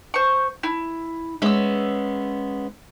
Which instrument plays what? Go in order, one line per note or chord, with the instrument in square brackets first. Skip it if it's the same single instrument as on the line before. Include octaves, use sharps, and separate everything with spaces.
[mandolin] C5 C#6
E4
[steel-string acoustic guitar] G#3 B3 C#4 [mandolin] E5 E6